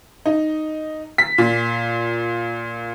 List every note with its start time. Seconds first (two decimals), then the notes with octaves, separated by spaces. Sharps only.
0.26 D#4
1.18 B6
1.38 A#2